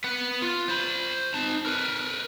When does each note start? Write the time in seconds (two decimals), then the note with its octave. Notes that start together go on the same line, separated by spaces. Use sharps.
0.04 B4 F#5
0.42 F4
0.68 C5 B5
1.34 D#4 A5
1.66 A#4 B4